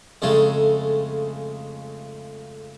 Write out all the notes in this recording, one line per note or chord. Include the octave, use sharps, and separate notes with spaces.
F2 C#3 G#3 A3